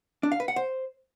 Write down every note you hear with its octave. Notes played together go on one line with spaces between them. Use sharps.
D4
F5
B4
F#5
C5